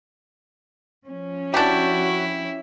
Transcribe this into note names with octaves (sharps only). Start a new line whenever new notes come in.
F3 C#4
D4 E4 F#4 G4